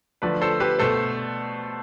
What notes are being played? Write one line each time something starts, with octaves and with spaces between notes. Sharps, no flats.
D3 F3 A3 B4 D5
A4 C5
G4 B4
B2 A3 A4 C5